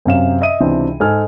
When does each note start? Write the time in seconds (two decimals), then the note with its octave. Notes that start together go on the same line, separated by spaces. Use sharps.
0.05 F#2 C3 F5 E7
0.41 D#5 E5 D#6 D#7
0.60 C#2 C3 E3 C4 D4
1.00 G#2 A4 G#5 F6